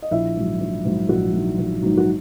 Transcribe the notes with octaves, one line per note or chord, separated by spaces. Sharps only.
D#5
A#1 E4 E5
G#2 D#3 F#3
A#1
G#2 D#3 F#3
A#1 F#4
G#2 D#3 F#3
A#1
G#2 D#3 F#3
F#4